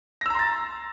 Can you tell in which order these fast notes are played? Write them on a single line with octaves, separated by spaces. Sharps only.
A#6 E6 A#5 C6 A6